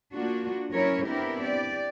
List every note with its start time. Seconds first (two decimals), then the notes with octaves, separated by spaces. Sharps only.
0.14 A#3 D4 F4 F#4
0.71 F#3 C#4 E4 A#4 C#5
1.07 B3 C4 D4 E4 G4 A#4
1.43 G4 D5